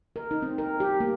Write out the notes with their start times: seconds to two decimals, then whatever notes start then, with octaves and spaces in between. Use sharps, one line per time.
0.16 A#4
0.31 D#4
0.42 C4
0.58 A#4
0.80 G4
1.00 A#3